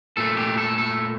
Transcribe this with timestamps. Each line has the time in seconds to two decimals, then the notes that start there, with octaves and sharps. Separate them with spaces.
0.17 A#2 A3 A4
0.37 G4
0.58 A4
0.78 A4